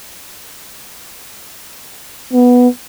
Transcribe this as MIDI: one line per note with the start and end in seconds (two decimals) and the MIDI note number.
2.33 2.68 59